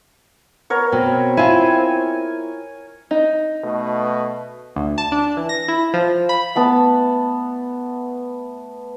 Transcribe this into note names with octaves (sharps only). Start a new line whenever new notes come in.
B3 A#4 C#5
B2 C4
E4 F4 G#5
D#4
B2 A3
D2
A5
D4
E3
A#6
E4
F3
B5
A3 B3 A5